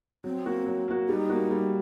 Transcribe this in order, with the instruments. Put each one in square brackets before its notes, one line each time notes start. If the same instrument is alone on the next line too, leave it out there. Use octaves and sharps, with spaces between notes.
[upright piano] F#3 [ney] C4
[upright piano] A#3 F#4
F#3
A#3 F#4
[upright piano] G3 [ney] D#4
[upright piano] A#3 F#4
G3